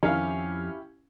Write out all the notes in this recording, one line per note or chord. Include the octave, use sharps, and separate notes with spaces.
F2 D#3 F3 C#4 E4 G4 F5